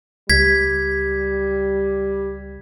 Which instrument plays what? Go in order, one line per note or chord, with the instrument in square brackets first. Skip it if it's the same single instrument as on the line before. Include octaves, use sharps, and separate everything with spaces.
[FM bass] C#2 [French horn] G3 [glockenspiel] G#6 B6